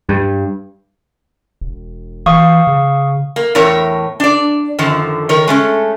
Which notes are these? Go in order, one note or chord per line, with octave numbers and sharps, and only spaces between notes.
G2
E1
E3 F5 C#6 D#6
C#3
A#3
E2 A2 A#4 C#5
D4 D5
F#2 D3 D#3 F3
D#3 A#4 C#5
G#3 A3 C#4